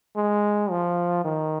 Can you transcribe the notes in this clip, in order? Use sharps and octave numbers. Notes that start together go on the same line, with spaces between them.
G#3
F3
D#3